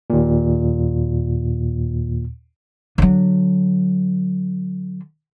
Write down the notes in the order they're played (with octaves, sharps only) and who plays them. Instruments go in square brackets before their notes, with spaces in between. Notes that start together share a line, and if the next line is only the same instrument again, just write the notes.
[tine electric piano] D#2 A#2
[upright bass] D3 F#3